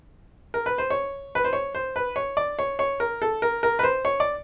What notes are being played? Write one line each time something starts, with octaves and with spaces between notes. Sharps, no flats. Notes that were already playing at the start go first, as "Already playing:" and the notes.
A#4
B4
C5
C#5
B4
C5
C#5
C5
B4
C#5
D5
C#5
C#5
A#4
A4
A#4
A#4
B4
C5
C#5
D5